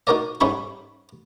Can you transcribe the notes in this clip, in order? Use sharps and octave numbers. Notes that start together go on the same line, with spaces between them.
D#4 F#4 A#4 D5 D#5
G#2 G3 C#4 D#4 B5 C#6